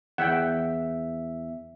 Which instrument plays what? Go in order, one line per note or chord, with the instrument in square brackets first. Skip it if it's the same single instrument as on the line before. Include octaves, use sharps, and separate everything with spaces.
[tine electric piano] E2 E5 [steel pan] F#5 G5